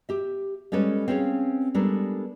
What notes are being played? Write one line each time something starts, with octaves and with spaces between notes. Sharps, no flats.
G4 E5
G3 G#3 C#4 A4 B4 C#5
C4 C#4 G#4 C#5 F5
G3 G#3 B3 D4 A4 A#4